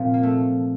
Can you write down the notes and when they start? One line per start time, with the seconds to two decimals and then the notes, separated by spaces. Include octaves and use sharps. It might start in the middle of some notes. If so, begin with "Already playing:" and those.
Already playing: A#2 F3 C4
0.14 A#3
0.23 A3